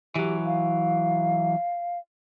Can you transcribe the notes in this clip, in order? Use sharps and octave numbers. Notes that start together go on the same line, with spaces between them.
E3 F#3 G4
F5